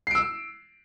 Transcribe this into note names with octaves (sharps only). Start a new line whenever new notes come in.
E6 C7 D7